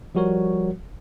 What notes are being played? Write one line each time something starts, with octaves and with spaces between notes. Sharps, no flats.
F3 G3 F#4 A#4 C#5